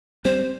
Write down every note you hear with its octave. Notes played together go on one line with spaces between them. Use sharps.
G3 C4 C5